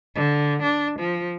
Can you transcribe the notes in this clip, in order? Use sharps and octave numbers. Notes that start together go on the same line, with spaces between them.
D3
D4
F3